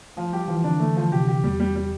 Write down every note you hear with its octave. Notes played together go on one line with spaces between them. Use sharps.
F3 A3
G3 G4
E3 F3
D3 D4
D3 A3
F3
C3 G4
G4
E2 G3
G3
G3